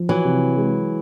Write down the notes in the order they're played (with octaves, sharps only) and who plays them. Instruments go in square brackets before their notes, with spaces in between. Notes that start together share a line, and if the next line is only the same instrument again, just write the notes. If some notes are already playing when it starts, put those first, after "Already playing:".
Already playing: [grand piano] F3
[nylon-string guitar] E3 F#3
[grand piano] C3
G#3